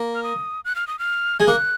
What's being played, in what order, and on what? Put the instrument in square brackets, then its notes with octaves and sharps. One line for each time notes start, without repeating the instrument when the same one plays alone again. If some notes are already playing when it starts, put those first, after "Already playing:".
Already playing: [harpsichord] A#3
[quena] F6
D#6
F#6
F6
D#6
F6
[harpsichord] G#3 [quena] G#6
[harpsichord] A#3 [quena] F#6